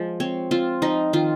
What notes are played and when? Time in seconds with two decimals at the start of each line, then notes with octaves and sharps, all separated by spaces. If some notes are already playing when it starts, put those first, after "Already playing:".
Already playing: F3 G#3
0.20 C4 C#5
0.51 C4 F4
0.82 F3 D#4
1.13 D#3 F4